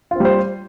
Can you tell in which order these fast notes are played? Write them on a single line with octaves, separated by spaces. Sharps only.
F4 C4 G3 C5